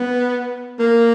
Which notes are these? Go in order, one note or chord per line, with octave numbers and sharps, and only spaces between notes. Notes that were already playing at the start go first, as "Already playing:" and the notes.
Already playing: B3
A#3